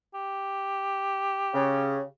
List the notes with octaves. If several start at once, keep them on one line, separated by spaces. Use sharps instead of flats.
G4
C#3